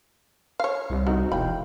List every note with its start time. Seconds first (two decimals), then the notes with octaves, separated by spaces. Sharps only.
0.60 C#5 F5
0.90 C2
1.07 A3 C4 D#4 F#4
1.32 E1 F5 G5 B5